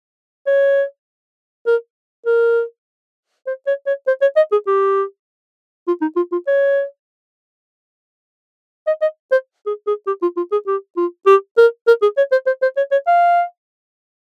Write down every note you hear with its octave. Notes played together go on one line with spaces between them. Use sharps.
C#5
A#4
A#4
C5
C#5
C#5
C5
C#5
D#5
G#4
G4
F4
D#4
F4
F4
C#5
D#5
D#5
C5
G#4
G#4
G4
F4
F4
G#4
G4
F4
G4
A#4
A#4
G#4
C#5
C5
C5
C5
C#5
C#5
F5